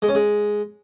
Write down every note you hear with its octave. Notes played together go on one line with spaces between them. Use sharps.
G#3
C#4
G#3